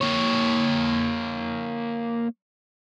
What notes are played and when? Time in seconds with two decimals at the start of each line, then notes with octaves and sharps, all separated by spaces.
0.01 A#3 C#5